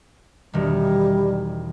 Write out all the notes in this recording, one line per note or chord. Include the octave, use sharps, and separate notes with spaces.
E1 D#3 G3